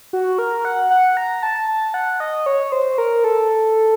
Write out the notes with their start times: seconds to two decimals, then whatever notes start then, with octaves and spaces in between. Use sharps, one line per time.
0.13 F#4
0.39 A#4
0.65 F#5
0.90 F#5
1.17 A#5
1.43 A5
1.68 A5
1.94 F#5
2.20 D#5
2.46 C#5
2.72 C5
2.98 A#4
3.24 A4